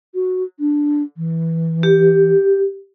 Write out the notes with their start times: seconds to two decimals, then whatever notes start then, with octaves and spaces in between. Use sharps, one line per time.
0.15 F#4
0.60 D4
1.17 E3
1.83 G4